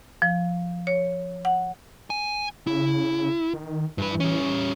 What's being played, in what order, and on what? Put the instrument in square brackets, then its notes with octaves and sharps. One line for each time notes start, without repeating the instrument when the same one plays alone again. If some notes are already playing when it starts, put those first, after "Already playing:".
[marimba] F3
C#5
F#5
[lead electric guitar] G#5
[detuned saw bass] C#3 [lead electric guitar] E4
[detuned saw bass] D#3
[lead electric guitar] G2 B4 [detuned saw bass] E3
[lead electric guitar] G3 C#4